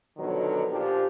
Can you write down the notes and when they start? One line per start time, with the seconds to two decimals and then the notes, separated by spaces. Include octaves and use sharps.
0.17 B2 D3 D#3 F3 F#3 B3
0.70 A#2 F3 D4 G4